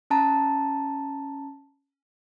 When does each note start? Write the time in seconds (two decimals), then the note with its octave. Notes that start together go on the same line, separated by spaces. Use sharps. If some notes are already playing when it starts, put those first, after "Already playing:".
0.10 C#4 A5 A#5